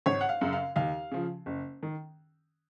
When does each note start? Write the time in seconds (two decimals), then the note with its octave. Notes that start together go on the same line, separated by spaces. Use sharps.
0.06 G#1 C#5
0.21 F#5
0.29 F5
0.41 F#2 C#3
0.53 F5
0.76 D#2 F5
1.12 C#3 F3
1.46 F#1
1.83 D#3